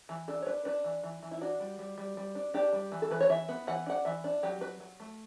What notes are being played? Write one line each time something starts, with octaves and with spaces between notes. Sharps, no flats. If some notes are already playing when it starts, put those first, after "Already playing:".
E3
D4 A4
C#5
D4 B4
D4 B4
E3
E3
E3
E4
D4 F#4
G3
G3
G3
G3
D4
D4 G4
G3
E3
A4
E3 B4
C#5
E3 E5
B3
E3 F#5
D4 F#5
E3 E5
D4
F#3 G4
F#3 B4
F#3
A3